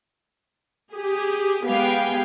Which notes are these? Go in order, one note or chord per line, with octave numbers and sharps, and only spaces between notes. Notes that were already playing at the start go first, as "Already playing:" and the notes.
G4 G#4
G#3 B3 G4 F5 G5 G#5